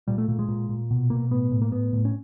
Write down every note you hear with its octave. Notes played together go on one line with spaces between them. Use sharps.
A#2 G3
A3
A#2 A3
G#3
A#2
A#2
B2
B2 A#3
A2 B3
A2
A#3
A2 B3
A2
C#4